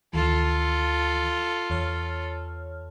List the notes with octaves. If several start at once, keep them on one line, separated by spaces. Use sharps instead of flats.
D2 D#3 E3 F4 A4
E2 C#5 F6